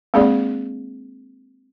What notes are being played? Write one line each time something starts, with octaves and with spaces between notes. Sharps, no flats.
G#3 A#3 C4 D4 G#4 D5